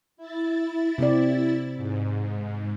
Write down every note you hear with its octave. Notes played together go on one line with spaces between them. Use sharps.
E4 A6
C3 C4 D5
G#2